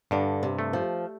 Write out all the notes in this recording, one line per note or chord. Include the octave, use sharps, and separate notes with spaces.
G2 D3
C3
A3
F3